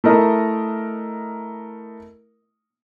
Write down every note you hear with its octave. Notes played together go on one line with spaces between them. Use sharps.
A3 E4 A#4 D#5